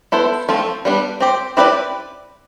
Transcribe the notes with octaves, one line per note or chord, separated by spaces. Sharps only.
B3 E4 A4 C5
F3 A3 C4 F4
G3 B3 D4
C4 G4 C5
C4 E4 G4 B4 D5